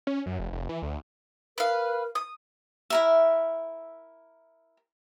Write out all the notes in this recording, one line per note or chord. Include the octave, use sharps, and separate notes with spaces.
C#4
F#2
F1
F1
E3
D2
A#4 B4 F5
D#6
E4 A#4 E5